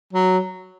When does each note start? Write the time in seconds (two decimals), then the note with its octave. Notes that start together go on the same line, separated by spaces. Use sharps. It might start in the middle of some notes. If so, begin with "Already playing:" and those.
0.13 F#3